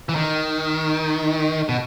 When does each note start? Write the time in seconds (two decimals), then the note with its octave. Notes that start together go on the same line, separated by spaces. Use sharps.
0.09 E3
0.16 D#3
1.69 B2